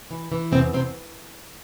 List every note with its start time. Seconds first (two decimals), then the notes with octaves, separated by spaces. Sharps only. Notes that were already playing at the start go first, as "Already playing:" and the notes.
0.11 E3
0.32 E3
0.52 E2 C3 C4
0.73 E2 C3 C4